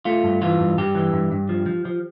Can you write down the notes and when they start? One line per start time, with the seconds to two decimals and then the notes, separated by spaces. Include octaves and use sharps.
0.05 A3 F4
0.24 G2
0.42 E3 F4
0.60 G2
0.78 G2 G4
0.95 E3
1.13 G2
1.32 G2
1.49 F3
1.66 F3
1.85 F3